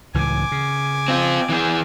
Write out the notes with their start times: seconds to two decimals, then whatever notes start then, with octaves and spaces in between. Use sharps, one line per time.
0.14 C#2 A2 E3 G#5 D6
0.52 C#3
1.08 C4 F4
1.50 E3 G#4